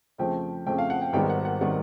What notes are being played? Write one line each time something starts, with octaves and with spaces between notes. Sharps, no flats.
F2 C#3 F3 A3 G5
F2 C#3 F3 A3 G5
F5
F#5
G5
G#1 G#2 D#3 G3 B3 G5
F#5
F#5
D#3 G3 B3 F#5